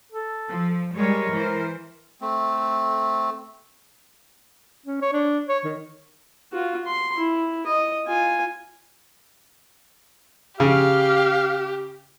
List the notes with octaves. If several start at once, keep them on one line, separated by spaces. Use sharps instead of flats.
A4
F3
G3 G#3 A#4 C#5
E3 C5
A3 C4
C#4
C#5
D4
C#5
D#3
F4 F#4
C6
E4
D#5
F4 G#5
C#3 G4 F5